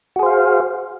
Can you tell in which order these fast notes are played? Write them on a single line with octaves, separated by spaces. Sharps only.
F#4 G#4 C5 F5